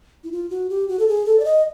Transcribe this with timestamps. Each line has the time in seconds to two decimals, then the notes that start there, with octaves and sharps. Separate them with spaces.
0.24 E4
0.32 F4
0.50 F#4
0.70 G4
0.88 F#4
0.99 A4
1.08 G#4
1.26 A4
1.40 D5
1.45 D#5